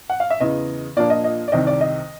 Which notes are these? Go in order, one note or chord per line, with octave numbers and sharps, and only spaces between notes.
F#5
F5
E5
E2 C#3 E3 D#5
A#2 F3 A#3 D4 D5
D#5
D#5
D5
C2 C3 D#3 D#5
D5
D#5